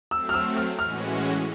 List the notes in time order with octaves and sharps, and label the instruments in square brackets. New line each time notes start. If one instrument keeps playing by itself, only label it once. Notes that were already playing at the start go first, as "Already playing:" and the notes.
[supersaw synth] F#3 A3 C4 [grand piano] E6
[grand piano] F6
E6
F6
[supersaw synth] A2 E3 G#3 C#4 F#4 [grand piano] F6